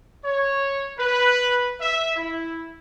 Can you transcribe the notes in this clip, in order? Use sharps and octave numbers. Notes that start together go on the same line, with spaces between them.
C#5
B4
E5
E4